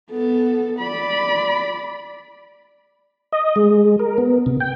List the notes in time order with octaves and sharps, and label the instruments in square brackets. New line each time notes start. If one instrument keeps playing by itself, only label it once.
[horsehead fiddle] B3 A4
D5 B5
[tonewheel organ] D#5
G#3
A#4
B3
C3
G5